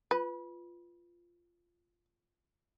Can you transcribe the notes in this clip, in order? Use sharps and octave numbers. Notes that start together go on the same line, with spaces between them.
F4 B4